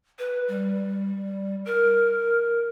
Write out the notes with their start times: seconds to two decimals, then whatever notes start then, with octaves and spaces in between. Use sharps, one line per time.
0.19 B4
0.48 G3
1.65 A#4